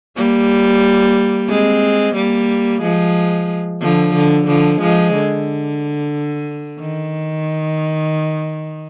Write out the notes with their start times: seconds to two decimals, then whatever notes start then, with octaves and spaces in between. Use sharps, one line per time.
0.16 G3 A#3
1.49 G#3 C4
2.15 G3 A#3
2.82 F3 G#3
3.81 D3 F3
4.15 D3
4.47 D3 F3
4.81 F3 G#3
5.14 D3
6.80 D#3